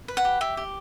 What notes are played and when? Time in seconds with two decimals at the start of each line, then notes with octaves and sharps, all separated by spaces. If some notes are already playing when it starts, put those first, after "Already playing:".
0.08 B4
0.17 F#5
0.25 G4
0.41 G4 E5
0.57 G4